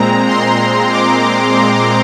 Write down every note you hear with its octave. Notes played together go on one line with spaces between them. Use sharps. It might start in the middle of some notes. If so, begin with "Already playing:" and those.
Already playing: A#2 G#3 C4 A#5
C6
D6
C6